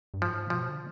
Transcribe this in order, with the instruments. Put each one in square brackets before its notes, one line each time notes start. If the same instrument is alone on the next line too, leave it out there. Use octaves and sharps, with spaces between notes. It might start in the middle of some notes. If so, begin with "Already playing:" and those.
[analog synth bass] G2
[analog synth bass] G#2 [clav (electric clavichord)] F3
[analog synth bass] B2 [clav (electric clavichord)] F3
[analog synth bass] D3